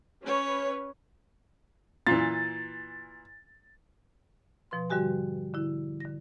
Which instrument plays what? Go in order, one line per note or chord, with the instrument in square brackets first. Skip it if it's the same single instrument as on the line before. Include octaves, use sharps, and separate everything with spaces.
[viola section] C#4 B4 C#5
[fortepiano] A#2 E3 [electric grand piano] A6
[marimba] B2 F3 B4 C6
G#2 D3 G3 F#4 G4 G#5
D3 E4
D3 A#6